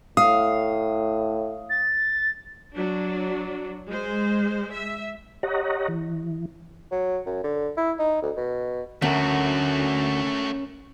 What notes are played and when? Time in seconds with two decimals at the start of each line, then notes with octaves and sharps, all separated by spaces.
0.17 A2 F5 D#6
1.69 A6
2.75 F#3 D4
3.89 G#3 C5
4.73 E5
5.43 G4 C#5 D#5 F#5 A#5
5.88 E3
6.91 F#3
7.26 F#2
7.44 D3
7.77 E4
7.99 D#4
8.22 D2
8.37 B2
9.02 D2 A3 C#4 F#4 A#4